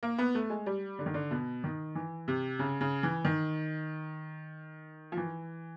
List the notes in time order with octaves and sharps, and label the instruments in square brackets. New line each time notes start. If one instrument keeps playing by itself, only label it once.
[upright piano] A#3
B3
A3
G#3
G3
D3
D#3
D3
B2
D#3
E3
C3
C#3
C#3
E3
D#3
F3
E3